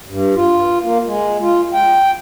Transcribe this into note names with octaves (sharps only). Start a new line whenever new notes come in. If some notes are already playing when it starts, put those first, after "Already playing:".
G2
F4
A#3
G#3
F4
G5